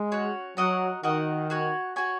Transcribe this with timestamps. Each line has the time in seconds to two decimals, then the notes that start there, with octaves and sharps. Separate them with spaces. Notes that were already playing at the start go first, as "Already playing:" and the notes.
Already playing: G#3
0.12 C#4 F#4 C#5
0.57 F#3 F#4 A#4 D#5 F#5
1.03 D#3 F#4 A#4 D#5 F#5
1.50 F#4 C#5 G#5
1.96 F#4 C#5 G#5